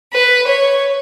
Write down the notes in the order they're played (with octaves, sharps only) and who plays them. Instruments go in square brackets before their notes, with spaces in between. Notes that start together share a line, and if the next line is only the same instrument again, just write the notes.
[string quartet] B4
C#5